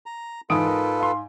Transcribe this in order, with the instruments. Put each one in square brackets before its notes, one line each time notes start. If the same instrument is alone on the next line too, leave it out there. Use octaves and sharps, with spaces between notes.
[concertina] A#5
[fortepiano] G#2 D#6 [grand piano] E3 D7 [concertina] F4 A4 B4
[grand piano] A#4
F5 C6